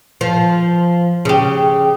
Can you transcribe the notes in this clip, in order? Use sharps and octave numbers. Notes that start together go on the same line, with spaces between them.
F3
C#3 G4